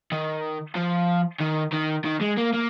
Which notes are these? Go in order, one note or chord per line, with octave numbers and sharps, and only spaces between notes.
D#3
F3
D#3
D#3
D#3
G#3
A#3
A#3